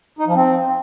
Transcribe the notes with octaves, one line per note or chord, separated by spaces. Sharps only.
D#4
F3
C4